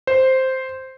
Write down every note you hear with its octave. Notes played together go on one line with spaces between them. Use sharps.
C5